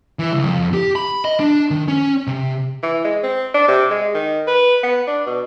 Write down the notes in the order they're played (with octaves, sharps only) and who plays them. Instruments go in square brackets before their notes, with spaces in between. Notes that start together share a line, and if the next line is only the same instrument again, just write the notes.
[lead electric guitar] E3
C#2
F2
G4
B5
D#5
D4
D#3
C#4
C3
[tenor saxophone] E3
G#3
C4
D4
C3
G#3
D#3
B4
B3
D4
B2